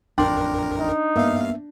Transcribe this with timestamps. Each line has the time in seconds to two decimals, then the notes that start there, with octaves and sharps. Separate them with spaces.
0.18 A1 F2 D4 A#4 G5 C6
0.79 D#4
1.16 G2 A#3 B3 E5 F5